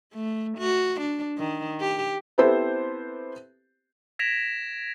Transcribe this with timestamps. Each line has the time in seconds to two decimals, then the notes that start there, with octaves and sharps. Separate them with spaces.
0.14 A3
0.58 F#4
1.00 D4
1.39 D#3
1.80 G4
2.38 B3 C4 E4 G4 A4 C5
4.19 G#6 A#6 B6 D7 E7 F7